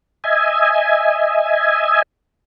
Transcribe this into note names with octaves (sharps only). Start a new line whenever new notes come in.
D#5 E5 G#5